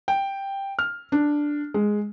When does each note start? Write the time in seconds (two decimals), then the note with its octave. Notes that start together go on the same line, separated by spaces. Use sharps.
0.08 G5
0.79 F6
1.12 D4
1.74 G#3